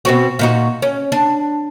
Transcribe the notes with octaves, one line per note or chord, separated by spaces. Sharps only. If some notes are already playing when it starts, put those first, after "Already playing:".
B2 C4 F#4
A#2 D#4 F#4
C#4
D4